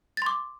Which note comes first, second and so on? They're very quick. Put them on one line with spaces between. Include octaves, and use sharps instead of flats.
A6 C6 D6